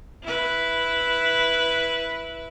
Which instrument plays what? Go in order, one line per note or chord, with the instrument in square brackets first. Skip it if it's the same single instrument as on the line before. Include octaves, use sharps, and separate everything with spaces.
[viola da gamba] E4 B4